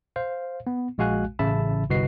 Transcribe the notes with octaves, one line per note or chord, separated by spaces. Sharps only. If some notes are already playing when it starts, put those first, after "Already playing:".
C5 F5
B3
A#1 G#3 F#4 F5 G#5 F#6
A1 C#3 E5 A5 B5
G1 C2 F#4 B4 D#5 C7